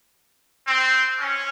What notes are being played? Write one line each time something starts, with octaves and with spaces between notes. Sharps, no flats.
C4
C#4